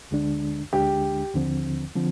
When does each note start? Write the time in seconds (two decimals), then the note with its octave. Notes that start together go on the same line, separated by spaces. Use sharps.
0.11 D2 D3 G#3 D4
0.73 D2 D3 G#3 D4 G4
1.34 D#2 D3 F3 C4
1.95 D3 F3 C4